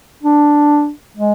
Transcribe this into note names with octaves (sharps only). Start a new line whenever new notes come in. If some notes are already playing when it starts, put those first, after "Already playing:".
D4
G#3